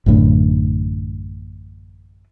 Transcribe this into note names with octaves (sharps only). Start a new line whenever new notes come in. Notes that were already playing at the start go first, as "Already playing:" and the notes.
A1 F#2 A2 D3